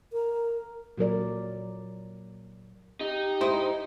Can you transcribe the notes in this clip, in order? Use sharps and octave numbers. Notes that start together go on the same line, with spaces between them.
A#4
A#2 F#3 A#4 D5
D#4 G4
G#2 E4 C5